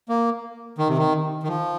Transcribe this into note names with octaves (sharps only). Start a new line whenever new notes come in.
A#3
D#3
C3
D#3
D#3
F3